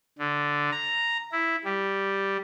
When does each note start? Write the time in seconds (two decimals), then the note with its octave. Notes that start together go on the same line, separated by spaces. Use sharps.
0.19 D3
0.72 A#5
1.32 E4
1.65 G3